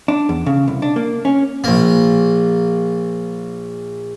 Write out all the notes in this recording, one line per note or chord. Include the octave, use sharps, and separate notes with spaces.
D4
E2
C#3
C2
D4
A#3
C#4
A#1 A#3